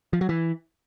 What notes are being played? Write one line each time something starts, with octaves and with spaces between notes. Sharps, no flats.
F3
F#3
E3